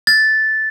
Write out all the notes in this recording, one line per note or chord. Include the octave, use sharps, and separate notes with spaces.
A6